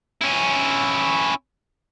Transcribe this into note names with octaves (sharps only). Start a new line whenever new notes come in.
C#4 E4